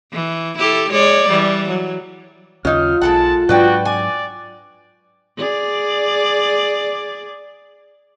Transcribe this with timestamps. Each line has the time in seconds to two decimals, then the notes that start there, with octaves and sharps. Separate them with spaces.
0.13 E3
0.58 E4 G4 A4
0.90 G#3 C#5 D5
1.28 E3 G3
1.69 F#3
2.65 D#2 C#3 F#3 C#4 D#4 F4 F6
3.02 B1 G#3 A4 F#5 A5
3.49 G#2 F#3 D4 F#4 B4 D5 G5
3.85 D5 G#5
5.38 G#4 D5